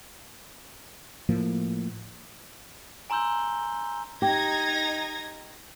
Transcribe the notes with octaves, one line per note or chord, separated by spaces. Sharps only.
A2 F3 A#3
G#5 A#5 C6 E6 G6 G7
D#4 G4 G#6 A#6